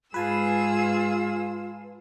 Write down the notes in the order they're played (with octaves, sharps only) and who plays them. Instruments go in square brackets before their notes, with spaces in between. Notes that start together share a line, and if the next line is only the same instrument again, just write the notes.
[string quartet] G#2 G#4 E6 [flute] F4 [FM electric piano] B4 G#5 A5